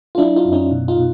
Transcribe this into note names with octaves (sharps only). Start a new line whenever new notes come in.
F4
F#3 D4 E4
D#4 F4
F#2
C#4 D#4
B2
D#4 F4
B2